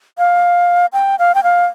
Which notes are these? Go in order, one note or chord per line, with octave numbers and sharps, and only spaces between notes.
F5
G5
F5
G5
F5